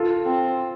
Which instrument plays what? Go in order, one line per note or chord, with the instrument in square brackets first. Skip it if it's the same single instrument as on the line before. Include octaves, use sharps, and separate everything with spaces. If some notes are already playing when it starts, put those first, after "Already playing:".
Already playing: [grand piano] F4 A4
[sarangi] C4